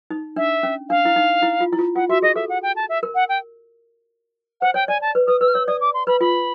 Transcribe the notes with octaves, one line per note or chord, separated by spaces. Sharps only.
D#4
D4 E5
C#4
D4 F5
E4
D#4
E4
F4
E4
F4
F4 F#5
F#4 E5
G#4 D#5
A4 E5
F#5
G5
A5
E5
A#4
F#5
G5
C5 F#5
C#5 G5
D5 G#5
A5
B4
B4 D#6
B4 E6
F6
C#5 E6
D5 D#6
D6
C6
B4 B5
F4 B5